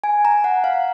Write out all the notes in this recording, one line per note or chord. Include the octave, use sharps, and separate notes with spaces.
G#5
A#5
F#5
F5